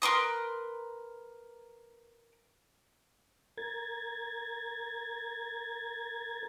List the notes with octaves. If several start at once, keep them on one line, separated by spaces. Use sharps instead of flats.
A#4 B4 C6 D#6
A#4 G#6 A6